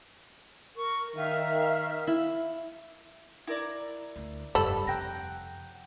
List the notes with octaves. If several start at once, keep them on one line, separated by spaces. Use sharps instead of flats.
A#4 C#6
D#3 E5 F5 F6
E4
E4 A#4 D5
D2
F1 G2 G3 A4 B5 E6
F2 C3 F#5 G5 A#5